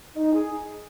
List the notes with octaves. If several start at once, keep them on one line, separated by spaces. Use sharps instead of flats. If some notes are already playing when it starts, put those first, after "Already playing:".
D#4
G#4